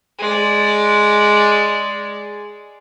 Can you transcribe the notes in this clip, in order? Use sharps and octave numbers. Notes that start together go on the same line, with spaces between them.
G#3 D5